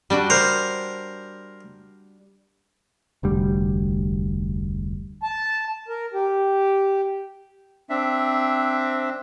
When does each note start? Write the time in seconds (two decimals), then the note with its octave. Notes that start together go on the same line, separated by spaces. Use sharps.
0.10 G3 D4 F#4
0.30 A#4 C5
3.23 F1 D2 G3
5.23 A5
5.88 A#4
6.14 G4
7.90 C4 D4 E5